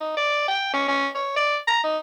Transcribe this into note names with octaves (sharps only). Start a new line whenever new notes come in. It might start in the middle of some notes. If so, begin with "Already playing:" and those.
D#4
D5
G5
C#4
C#4
C#5
D5
A#5
D#4